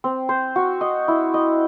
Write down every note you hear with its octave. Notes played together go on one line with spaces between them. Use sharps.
C4
C5
F#4
D#5
E4
D#5